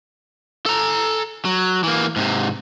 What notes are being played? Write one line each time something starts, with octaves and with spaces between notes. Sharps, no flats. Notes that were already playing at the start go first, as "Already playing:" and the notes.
A4 A#5
F#3
E3 A#3
G#2 C3